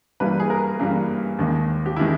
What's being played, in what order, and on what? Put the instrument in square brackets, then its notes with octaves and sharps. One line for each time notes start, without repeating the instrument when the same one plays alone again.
[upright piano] G2 E3 G3 A#3 B4
G#4
A#4
G2 E3 G3 A#3
D#2 D#3 G#3
G4
D#3 G#3 E4